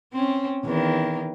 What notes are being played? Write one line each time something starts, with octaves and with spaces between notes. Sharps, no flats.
C4 C#4
E2 D#3